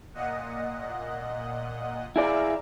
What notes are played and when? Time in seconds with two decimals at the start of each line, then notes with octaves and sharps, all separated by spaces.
0.14 A#2 D#5 F#5
2.16 E4 G#4 D5 E5 F5 A#5